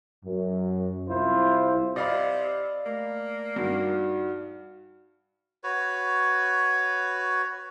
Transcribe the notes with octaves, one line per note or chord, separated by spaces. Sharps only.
F#2
C2 E4 F4 C5
C3 D5 D#5 F5 B5
A3 A#3
G2 D#4 F#4 F#5
F#4 B4 C#5